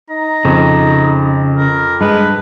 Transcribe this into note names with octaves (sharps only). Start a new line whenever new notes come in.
D#4 A#5
F2 C#3
A#4
G2 G#3 B4